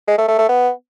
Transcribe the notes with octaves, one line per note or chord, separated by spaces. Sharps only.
G#3
A3
A3
A3
B3